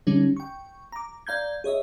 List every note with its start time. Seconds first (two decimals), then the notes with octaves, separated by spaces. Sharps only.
0.07 D3 G3 C#4 D#4
0.37 G5 C#6
0.92 A#5 D6
1.27 D5 F5 A#5 G6 G#6
1.64 G#4 C#5 D#5 E5